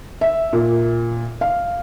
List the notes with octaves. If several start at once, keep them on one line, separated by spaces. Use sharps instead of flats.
E5
A#2
F5